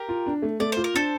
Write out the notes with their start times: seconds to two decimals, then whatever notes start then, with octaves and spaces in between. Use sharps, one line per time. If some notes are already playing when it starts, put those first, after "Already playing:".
Already playing: G4 A#4
0.09 F4
0.26 D4
0.42 A3
0.60 A3 D5
0.72 F4 C5
0.84 A#4
0.94 D4 A4 C5